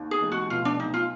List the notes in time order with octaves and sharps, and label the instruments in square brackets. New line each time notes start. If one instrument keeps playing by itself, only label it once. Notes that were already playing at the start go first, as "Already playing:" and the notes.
Already playing: [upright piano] D#2 D#3
[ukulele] G#4
[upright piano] F1
[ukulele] F#4
[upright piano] B2 [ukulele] F4
[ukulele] D4
[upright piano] B1 [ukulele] D#4
[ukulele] F4